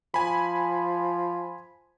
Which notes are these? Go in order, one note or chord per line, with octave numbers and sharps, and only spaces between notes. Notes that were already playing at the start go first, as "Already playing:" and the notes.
F3 G#5 B5